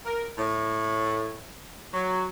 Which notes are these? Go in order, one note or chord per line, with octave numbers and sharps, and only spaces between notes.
A#4
A2
F#3